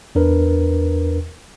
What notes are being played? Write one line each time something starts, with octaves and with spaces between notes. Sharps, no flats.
E2 D4 A#4 B4